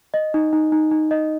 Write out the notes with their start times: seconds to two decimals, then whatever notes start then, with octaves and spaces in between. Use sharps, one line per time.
0.14 D#5
0.34 D#4
0.53 D#4
0.72 D#4
0.91 D#4
1.11 D#5